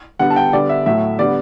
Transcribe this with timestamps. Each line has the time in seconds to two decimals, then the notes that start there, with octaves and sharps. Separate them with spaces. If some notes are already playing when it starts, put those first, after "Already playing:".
0.19 D3 G3 B3 F#5
0.30 A5
0.36 G5
0.53 D3 G3 B3 D5
0.69 E5
0.86 A2 F#3 A3 E5
1.19 D3 G3 B3 D5